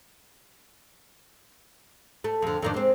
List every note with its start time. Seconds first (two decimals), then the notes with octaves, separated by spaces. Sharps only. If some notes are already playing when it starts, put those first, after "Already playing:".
2.24 A3
2.42 F2 D3
2.62 F2 D#3 D4
2.74 G#3 C4